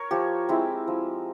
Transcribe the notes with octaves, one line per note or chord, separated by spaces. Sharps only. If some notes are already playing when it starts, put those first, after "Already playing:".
Already playing: A#4 C#5
F3 G4
G#3 C4 E4
F3